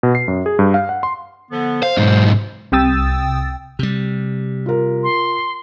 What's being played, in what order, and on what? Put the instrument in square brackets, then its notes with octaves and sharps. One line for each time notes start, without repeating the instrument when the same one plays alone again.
[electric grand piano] B2
C7
F#2
G#4
G2
F5
F#5
C6
[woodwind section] D3 F3 B3
[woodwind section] C5 [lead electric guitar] F5
[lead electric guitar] B1 G#2
[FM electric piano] C2 C3 G5 D#6 E6 A6
[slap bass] C3 G3
[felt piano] F4 A#4
[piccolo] C6